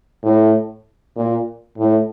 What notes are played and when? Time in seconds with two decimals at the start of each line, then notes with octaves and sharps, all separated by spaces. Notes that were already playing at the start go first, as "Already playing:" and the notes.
0.24 A2
1.17 A#2
1.78 A2